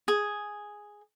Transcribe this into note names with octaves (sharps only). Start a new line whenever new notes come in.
G#4